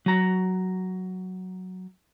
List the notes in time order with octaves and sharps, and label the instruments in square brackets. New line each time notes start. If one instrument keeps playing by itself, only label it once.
[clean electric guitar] F#3 A#5